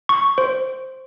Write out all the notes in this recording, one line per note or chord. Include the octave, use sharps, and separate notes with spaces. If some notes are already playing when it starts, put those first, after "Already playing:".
C#6
C5